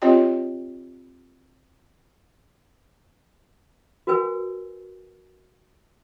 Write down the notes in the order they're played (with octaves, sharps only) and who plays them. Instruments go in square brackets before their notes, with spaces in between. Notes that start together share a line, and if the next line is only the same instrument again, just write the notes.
[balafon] C4 F4 G4 C#5 D#5 G5
[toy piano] F#4 A#4 B4 G#5 E6